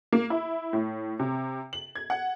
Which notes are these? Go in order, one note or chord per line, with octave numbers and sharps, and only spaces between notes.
A#3
E4
A2
C3
F#7
G#6
F#5